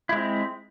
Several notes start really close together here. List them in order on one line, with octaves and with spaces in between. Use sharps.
E4 G#3 C4